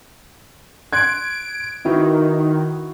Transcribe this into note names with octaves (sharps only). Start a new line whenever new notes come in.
C6 F#6 G#6 D7
D#3 E4 F#4 B4